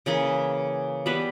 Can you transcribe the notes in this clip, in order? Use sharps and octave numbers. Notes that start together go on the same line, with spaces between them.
C#3 E3 A#3 G#4
E3 G3 B3 B4